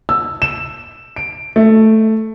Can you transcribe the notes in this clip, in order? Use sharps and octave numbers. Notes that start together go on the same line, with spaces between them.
E6
E7
D7
A3